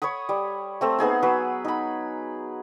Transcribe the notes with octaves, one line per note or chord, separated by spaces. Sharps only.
C#5 B5 C#6 D#6
G3
A3 C4 A4
B3 D#4 G#4 C6
F#3 B4 B5 E6
D#4 B5